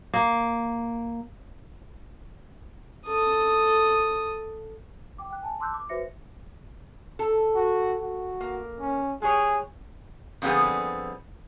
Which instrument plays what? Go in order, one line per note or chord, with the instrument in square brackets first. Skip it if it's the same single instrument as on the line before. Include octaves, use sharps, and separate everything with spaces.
[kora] A#3
[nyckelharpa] A4 D#6
[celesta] G5 D6
G5 F#6
G#5 A5
A5 C6 D6 E6 F#6 G6
D6
F#4 B4 C5 E5 A#6 C#7
[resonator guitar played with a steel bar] A4
[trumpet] F#4
F#4
[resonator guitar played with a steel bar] A#3
[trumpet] C#4
[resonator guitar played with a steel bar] G#3 G4 C#5 [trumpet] G#4
[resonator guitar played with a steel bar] F2 D3 G3 B3 C4 G#4